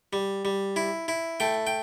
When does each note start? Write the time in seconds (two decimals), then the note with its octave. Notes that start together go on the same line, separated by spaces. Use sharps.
0.13 G3
0.45 G3
0.76 E4
1.08 E4
1.40 A3 G5
1.67 G5